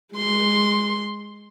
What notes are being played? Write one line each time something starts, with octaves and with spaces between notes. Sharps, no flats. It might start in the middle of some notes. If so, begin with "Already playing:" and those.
G#3 C6